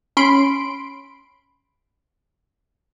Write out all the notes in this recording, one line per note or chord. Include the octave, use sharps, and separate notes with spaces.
C#4 B5 C6 D7